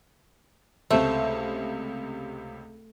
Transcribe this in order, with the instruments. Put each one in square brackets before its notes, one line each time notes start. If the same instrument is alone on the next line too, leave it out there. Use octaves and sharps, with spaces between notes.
[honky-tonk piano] C#2 C3 C5 [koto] A3